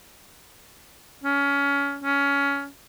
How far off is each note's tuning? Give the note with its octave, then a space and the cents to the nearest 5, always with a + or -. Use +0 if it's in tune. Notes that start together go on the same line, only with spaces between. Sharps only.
C#4 +25
C#4 +20